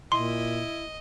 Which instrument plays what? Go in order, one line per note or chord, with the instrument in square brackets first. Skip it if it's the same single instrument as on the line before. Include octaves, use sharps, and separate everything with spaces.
[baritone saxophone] A#2 [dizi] E4 [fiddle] D#5 [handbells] C6